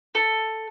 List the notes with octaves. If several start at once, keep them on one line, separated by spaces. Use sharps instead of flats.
A4